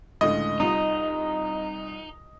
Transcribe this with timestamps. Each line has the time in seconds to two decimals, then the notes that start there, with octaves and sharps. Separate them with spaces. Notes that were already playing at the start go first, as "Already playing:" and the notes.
0.21 C#2 A2 D3 D#5
0.60 C2 D#4 F4